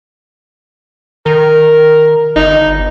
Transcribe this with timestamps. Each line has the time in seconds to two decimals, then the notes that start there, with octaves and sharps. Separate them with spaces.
1.26 D#3 A#4
2.36 G1 D#4